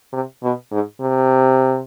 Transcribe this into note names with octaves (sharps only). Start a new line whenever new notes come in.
C3
B2
G#2
C3